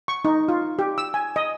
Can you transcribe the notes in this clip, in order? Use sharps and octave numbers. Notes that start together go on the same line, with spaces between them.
C#6
D#4
F4
G4
E6
G#5
D#5